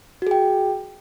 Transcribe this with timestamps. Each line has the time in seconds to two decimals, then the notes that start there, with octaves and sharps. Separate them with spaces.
0.22 F#4
0.27 G#4
0.31 G5